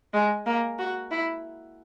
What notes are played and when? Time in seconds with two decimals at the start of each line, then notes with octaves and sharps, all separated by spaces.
0.14 G#3
0.46 A#3
0.79 F#4
1.11 E4